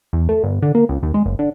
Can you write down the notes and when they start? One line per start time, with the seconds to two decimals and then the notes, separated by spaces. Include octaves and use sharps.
0.13 E2
0.29 A3
0.43 G1
0.62 D3
0.75 A#3
0.89 C#2
1.03 D#2
1.14 G#3
1.26 F#1
1.39 D3